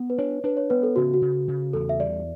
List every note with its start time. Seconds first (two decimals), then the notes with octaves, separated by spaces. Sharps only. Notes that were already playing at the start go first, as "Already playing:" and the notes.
Already playing: B3
0.10 B4
0.18 D4 C#5
0.44 D4 B4
0.57 C#5
0.70 B3 B4
0.83 A4
0.96 C#3 F#4
1.14 F#4
1.22 C#3
1.48 C#3
1.73 E2 A4
1.89 E5
1.99 G3 D5